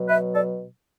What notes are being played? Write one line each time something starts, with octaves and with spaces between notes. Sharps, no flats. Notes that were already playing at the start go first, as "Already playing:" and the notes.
Already playing: B2 F#3
B4 E5
A4 D5